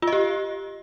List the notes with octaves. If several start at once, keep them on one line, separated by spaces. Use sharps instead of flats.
F4
D#5
G4